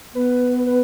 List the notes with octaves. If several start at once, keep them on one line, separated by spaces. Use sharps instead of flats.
B3 B4
B4